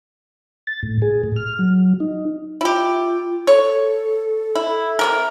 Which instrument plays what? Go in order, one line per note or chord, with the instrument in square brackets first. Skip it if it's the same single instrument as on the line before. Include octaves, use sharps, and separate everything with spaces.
[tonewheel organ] A6
A2
G#4
A2
F6
F#3
D#4
[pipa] E4 G4 [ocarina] F4
[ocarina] A4 [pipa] C#5
[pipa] E4
C3 A#3 A#4